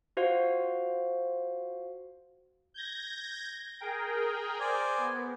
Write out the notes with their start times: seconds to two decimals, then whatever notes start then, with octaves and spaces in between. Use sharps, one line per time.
0.17 F4 F#4 C5 F5
2.74 G6 G#6 A#6
3.80 G#4 A#4 G5
4.60 C5 D5 G#5
4.98 B3